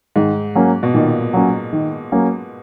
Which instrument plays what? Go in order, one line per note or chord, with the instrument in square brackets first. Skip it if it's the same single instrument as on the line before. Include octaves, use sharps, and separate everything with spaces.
[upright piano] G#2 [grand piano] D#3
[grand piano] F#3 A#3 C#4
[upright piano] B2
[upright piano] A#2 [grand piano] D#3
[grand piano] F#3 A#3 C#4
D#3
F#3 A#3 C#4